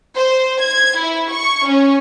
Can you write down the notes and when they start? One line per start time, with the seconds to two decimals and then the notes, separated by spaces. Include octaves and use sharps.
0.15 C5
0.61 G#6
0.99 E4
1.33 C#6
1.67 C#4